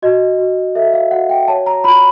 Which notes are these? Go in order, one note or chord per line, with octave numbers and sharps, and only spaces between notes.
F#4 D#5
F#4
A4 E5
F5
F#4 F#5
G5
C#5 A5
A#5
F4 B5